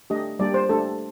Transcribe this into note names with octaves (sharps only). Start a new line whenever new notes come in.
A3 D4 G4 D#5
G3 A#3 D4 G4 D5
C5
A3 D4 G4 A4